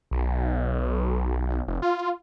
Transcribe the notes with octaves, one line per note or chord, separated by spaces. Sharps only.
B1
F1
F4